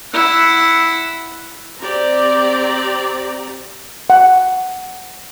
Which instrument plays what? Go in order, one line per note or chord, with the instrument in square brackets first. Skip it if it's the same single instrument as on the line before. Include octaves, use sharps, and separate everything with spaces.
[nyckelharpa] E4 F#5
[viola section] C4 G4 D5 A#5
[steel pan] F#5